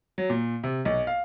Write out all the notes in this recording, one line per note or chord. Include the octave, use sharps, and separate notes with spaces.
F#3
A#2
C3
B1
F5